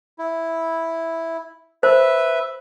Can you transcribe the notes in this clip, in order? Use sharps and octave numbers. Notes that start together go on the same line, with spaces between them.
E4
B4 C5 E5